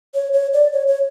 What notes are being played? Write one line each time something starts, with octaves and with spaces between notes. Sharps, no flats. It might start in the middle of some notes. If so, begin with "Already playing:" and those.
C#5
C#5
D5
C#5
C#5